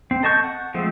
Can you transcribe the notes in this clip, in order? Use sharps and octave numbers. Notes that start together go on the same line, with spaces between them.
C4
A4 D#5 A5 C#6 G6
F#5
F3 G#3 A3 C4